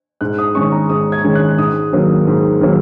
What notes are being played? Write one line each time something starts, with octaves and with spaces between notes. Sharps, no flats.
G#2 F#6
D#6
D#3 G#3 C#4 C#6
A#5
G#2 D#6
G#6
D#3 G#3 C#4
F#6
G#2 D#6
D#3 F#3 A#3
G#2
D#3 F#3 A#3